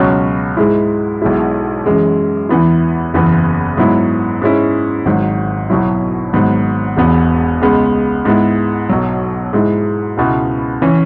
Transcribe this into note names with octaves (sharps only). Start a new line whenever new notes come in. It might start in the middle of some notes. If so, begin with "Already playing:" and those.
Already playing: C#2 B2 F#3 C#4
G#2 G#3 E4
B1 B2 G#3 E4
F#2 E3 G#3
E2 E3 B3 E4
F#1 E2 E3 B3
G#2 F#3 B3 E4
G#2 G#3 C#4 E4
G#1 G#2 F#3
B1 B2 F#3 E4
G#1 G#2 F#3 B3
E1 E2 E3 B3
C#2 C#3 G#3 B3
G#2 G#3 B3 E4
B1 B2 F#3
G#2 G#3 E4
C#2 B2 B3 E4
E3 C#4